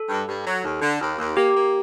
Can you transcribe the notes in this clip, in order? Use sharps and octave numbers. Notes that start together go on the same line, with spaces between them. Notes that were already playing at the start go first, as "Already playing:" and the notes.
Already playing: A4
G2
G2
F#3
D#2
D3
D#2
D#2
A#3 G4
A#3